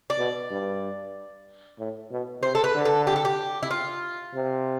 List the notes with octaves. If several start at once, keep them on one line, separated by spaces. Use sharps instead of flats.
D5
B2
G2
A2
B2
C3 C5
A4
B4
D3
A4
G4
A4
G4
E4
F4
C3